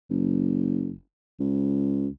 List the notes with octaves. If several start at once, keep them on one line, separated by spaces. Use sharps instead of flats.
F#1
C#2